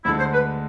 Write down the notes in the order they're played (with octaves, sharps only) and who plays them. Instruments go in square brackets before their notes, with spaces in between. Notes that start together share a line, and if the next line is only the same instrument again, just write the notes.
[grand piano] D2 D3 G#3 [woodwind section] E4
[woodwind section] C5
B4